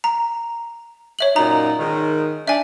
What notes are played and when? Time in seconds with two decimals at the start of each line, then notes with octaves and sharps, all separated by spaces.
0.04 A#5
1.19 C#5 E5 F#7
1.36 F#2 A#2 D#4 A#5
1.80 G#2 D#3
2.47 D4 E5 G#5